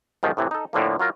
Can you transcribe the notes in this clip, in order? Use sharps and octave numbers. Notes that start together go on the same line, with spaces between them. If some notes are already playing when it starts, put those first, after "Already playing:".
B1 G#2 D#3 F3
A2 C3 E3
D#4 A4
A2 D3 F3 A#3
F#3 F4 A#4